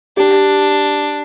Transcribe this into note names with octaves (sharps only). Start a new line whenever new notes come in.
D4 G4